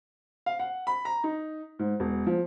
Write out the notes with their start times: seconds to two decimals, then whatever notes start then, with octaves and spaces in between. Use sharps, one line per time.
0.46 F5
0.59 F#5
0.87 B5
1.05 A#5
1.24 D#4
1.79 G#2
2.00 E1
2.27 F3